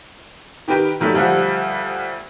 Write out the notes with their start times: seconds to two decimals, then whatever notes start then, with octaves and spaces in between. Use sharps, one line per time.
0.68 D#3 G4 A#4 B4 G5 D7
1.00 D#3 F#3 G3 A3
1.15 D2 F3 G3 F#5